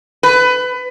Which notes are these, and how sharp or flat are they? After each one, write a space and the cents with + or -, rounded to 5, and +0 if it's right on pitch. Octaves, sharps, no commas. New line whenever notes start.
B4 +25